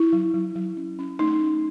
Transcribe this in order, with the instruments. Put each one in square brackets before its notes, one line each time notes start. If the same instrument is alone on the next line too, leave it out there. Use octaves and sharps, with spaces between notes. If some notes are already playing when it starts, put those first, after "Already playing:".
Already playing: [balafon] E4
F#3
F#3
F#3
C#4
C#4
A3 D#4
C#4